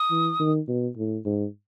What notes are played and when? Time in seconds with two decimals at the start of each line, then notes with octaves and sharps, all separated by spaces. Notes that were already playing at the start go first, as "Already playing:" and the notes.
Already playing: D#6
0.11 E3
0.40 D#3
0.68 B2
0.98 A2
1.25 G#2